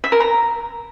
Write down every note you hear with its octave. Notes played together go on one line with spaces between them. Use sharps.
E5
A#4
A#5